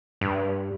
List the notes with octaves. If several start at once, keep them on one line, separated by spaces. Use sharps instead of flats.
G2